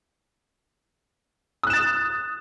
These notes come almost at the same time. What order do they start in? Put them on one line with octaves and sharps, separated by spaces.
D#6 F#6 E7 A6